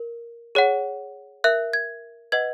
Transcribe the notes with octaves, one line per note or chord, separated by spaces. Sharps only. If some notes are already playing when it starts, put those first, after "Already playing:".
Already playing: A#4
G#4 C#5 F#5
A#4 E5 F#6
G#6
B4 D#5 F#5 G#6